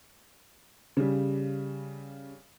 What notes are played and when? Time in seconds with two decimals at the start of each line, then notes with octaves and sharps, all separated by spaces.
0.97 C#3 G3